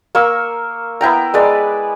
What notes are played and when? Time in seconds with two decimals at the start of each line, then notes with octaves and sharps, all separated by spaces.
0.15 A#3 C#6 E6
1.01 B3 E4 G5 A#5
1.34 G#3 B4 D5 B5